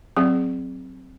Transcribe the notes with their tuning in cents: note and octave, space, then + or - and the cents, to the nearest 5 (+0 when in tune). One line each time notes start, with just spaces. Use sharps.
F#3 +0 C4 +0 G#4 +5